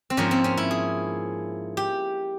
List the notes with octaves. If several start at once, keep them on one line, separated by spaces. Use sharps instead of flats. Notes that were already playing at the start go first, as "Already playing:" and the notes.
C4
G#2 F3 A#3 C#4
C4
C#4
E4
G#4
G4